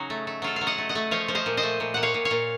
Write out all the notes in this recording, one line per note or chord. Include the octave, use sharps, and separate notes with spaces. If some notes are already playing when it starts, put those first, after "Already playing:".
Already playing: C#3 F#3 D#4 F#4
A3
A3
F#3 F4 A4
F5
F#3
D#5 F#5
A3
D#5 F#5
A3
F3 C#5 F5
F3
C5 D#5
A#2
C5 D#5
A3
A#2
A#2 F#5
C#5 F5
A#2
C#5 F5
A#2